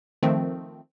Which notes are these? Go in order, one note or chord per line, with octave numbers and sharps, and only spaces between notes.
D#3 F3 A3 C4